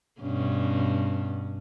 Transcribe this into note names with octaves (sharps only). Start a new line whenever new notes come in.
G2 B2 C#4